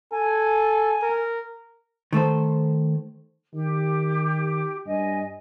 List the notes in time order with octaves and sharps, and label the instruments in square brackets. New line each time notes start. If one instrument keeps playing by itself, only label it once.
[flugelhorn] A4 [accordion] G#5
[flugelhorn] A#4
[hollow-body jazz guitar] D#3 A3 A4 C5
[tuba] D#3 [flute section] G4
[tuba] G2 [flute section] D#5 G#5